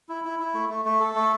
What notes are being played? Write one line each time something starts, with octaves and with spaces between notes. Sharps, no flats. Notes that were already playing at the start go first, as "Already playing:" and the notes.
E4
E4
E4
A3
A3
A3
A4
A3